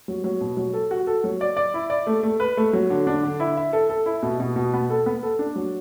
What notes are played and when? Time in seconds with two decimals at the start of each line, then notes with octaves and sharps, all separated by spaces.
0.08 F#3
0.24 F#3
0.41 B2
0.57 F#3
0.73 A4
0.91 F#4
1.07 A4
1.24 F#3
1.41 D5
1.57 D5
1.74 E4
1.90 D5
2.07 A3
2.23 A3
2.40 B4
2.57 A3
2.73 F#3
2.90 D3
3.07 D4
3.23 D3
3.40 E4
3.57 E5
3.73 A4
3.90 A4
4.06 E4
4.23 B2
4.40 B2
4.56 B2
4.74 B3
4.90 A4
5.06 B3
5.23 A4
5.39 D4
5.56 F#3